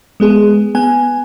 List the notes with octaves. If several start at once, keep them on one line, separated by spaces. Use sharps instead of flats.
G#3 B3 G#4
B3 G#5